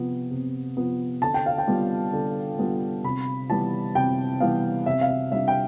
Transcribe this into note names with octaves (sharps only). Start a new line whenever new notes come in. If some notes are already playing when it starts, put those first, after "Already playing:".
Already playing: C3 F3 B3
C3
F3 B3
D3 A5
G5
F5
G5
G3 B3 F4
D3
G3 B3 F4
C3 B5
E3 G3 B3 A5
C3 G5
E3 G3 B3 F5
C3 E5
F5
E5
G3 D4 E5
G5